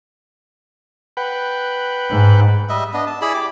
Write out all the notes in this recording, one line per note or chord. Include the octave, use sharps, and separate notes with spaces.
B4 F#5 G5
G#2
G3 D#5 E5
B3 D4 D#5
A5
E4 G#4 D5 B5
G4 D6